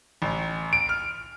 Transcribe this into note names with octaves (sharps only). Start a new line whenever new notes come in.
A1
D7
F6